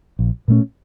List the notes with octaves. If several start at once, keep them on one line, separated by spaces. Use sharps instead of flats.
A#1
A#2 A3 C#4